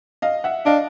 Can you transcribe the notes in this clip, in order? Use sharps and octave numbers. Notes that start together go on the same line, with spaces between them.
D#5 F5
E5 F#5
D4 D#5 F5